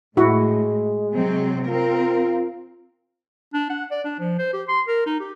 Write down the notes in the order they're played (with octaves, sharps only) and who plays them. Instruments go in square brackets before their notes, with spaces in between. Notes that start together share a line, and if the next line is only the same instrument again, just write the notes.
[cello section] A2 [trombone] G#3 [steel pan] E4 F#4
[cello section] C3 F#3 C4
[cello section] C4 A#4 [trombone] F4
[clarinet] D4
F#5
D5
D4
F3
C5
G4
C6
A#4
D#4
G4